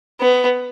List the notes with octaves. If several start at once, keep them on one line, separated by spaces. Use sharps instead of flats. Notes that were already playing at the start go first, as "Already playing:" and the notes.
B3